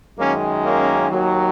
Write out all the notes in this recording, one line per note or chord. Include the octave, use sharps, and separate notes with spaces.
F#2 D#3 G#3 A#3 C#4
A#3 C#4
D#2 D#3 F#3